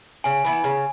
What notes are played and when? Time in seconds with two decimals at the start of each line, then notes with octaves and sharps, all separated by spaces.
0.24 C#3 G#5
0.44 E3 B3 E4
0.64 C#3